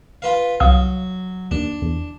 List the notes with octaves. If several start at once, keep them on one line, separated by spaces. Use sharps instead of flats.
F4 B4 F5
C2 F#3 F5 D#6
D#2 D4
E2